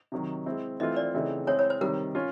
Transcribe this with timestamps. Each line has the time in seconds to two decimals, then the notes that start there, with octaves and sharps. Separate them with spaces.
0.12 C3 D#3 F#3
0.46 G#3 C4 E4
0.80 E3 A3 C4 F4 D#5
0.96 D5
1.14 C#3 E3 A3 C4 D#4
1.47 G#3 C4 E4 G#4 C#5
1.59 C#5
1.70 C5
1.81 C3 D#3 G3 A#4
2.15 C#4 F4